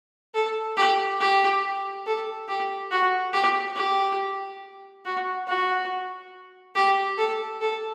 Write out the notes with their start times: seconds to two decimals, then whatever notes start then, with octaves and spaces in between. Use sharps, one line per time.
0.34 A4
0.77 G4
1.20 G4
2.06 A4
2.48 G4
2.91 F#4
3.33 G4
3.76 G4
5.05 F#4
5.48 F#4
6.75 G4
7.18 A4
7.61 A4